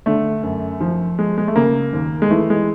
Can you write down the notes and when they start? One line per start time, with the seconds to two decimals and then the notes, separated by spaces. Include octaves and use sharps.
0.06 D3 A3
0.43 F#2
0.80 F3
1.19 G#3
1.38 G#3
1.48 A3
1.56 C#3 A#3
1.93 D#2
2.22 G#3
2.30 E3 A3
2.50 G#3